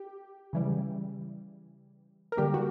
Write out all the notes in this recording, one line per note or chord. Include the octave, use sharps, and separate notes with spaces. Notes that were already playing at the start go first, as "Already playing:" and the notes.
Already playing: G4
C#3 E3 G3
A#4
D3 G3 A#3 G4
F#4